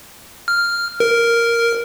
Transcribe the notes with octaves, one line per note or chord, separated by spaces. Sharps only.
F6
A#4